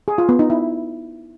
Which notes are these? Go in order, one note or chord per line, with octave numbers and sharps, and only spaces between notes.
G#4
F4
B3
D#4
E4